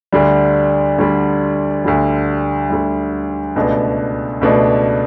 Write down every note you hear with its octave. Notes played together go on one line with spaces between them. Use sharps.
D2 D3 G3
D2 D3 G3
D2 D3 G3
D2 D3 G3
C#2 B2 A3 D4
C#2 B2 A3 D4